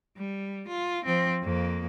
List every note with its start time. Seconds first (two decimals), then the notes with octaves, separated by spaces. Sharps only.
0.17 G3
0.68 F4
1.05 F3 C4
1.43 F2 A#3